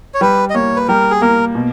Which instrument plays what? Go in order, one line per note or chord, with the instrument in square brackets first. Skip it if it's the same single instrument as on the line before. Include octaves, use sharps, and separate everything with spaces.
[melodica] C#5
[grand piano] G3 [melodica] B4
[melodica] D#5
[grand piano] A#3 [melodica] C#5
[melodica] B4
[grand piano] G3 [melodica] A#4
[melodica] G#4
[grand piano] A#3 [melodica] A#4
[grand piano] B2